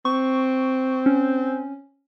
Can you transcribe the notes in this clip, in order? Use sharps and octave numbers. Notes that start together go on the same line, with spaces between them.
C4 C#6
C#4